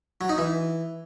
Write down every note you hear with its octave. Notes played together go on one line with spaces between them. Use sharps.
F#3
D#4
E3